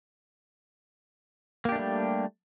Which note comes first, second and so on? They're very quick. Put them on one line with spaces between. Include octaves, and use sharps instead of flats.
A#3 G4 D4 A3 G3